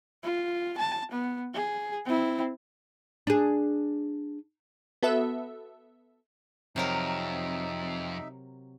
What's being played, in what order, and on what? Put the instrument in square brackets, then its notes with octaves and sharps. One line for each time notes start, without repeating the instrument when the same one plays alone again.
[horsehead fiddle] F4
A5
B3
G#4
C4 E4
[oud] D4 G#4
[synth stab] B3 F#4 A4 B4 E5
[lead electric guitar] F2 [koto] C3 F#3 A#4 [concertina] D#4 E5